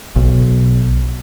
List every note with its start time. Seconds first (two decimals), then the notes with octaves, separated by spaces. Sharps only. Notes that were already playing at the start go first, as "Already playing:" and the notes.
0.16 B1